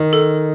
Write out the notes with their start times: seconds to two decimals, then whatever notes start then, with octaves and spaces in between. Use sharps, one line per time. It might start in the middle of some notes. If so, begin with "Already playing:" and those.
Already playing: D#3
0.13 A4